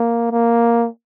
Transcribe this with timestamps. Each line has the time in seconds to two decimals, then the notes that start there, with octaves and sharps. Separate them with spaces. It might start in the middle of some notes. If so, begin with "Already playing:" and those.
Already playing: A#3
0.31 A#3